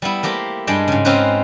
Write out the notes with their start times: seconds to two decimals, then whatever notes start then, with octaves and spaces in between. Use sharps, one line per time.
0.02 G3 B3 E4
0.23 A3 A#3 G4 C5
0.67 G2 G3 G#3 D4 G5
0.88 G#2 C#3
1.05 C4 C#4 D#4 F4 B4 C5